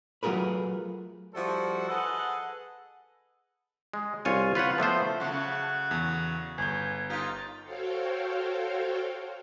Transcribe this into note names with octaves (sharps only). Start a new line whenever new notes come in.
F#3 A3 F4 G#4 A#4 B4
F3 G3 E4 F#4 A4 C5
G#4 A4 B4 D#5 F#5
G#3
C2 F4 C#5 G#5
F4 B4 C#5 F#5
F3 A3 B3 C5
C#3 F#3 A3 F#5
E2
G1 G#5 G6
D#4 F4 G4 A#4
F#4 A4 C5 C#5 F5 G5